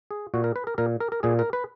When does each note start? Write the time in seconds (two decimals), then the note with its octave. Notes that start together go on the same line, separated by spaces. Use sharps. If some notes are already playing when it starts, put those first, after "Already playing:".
0.11 G#4
0.34 A#2 F#4
0.44 A#4
0.56 B4
0.67 A#4
0.78 A#2 A#4
1.00 A#4
1.12 A#4
1.23 A#2 G#4
1.39 A#4
1.53 B4